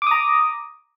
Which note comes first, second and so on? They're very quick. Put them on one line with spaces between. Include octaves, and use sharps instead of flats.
D6 D#6 A#5